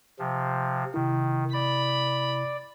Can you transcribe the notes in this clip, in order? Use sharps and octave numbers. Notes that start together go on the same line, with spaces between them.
C3 F3
C3 D#3 E4
D5 B5